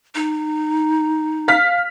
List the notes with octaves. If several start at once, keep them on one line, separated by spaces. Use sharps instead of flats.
D#4
F5 F6 B6